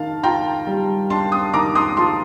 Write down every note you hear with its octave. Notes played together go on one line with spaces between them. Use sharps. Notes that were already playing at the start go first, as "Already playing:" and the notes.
Already playing: D#3 D4 F5 A5
F4 G5 A#5
G3
D4 A5 C6
C6 D#6
D#3 A#5 D6
C6 D#6
F4 A5 C6